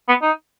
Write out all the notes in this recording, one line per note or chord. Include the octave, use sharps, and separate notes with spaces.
B3
D#4